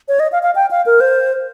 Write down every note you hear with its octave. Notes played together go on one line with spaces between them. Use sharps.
C#5
D#5
F5
F5
G5
F5
A#4
C5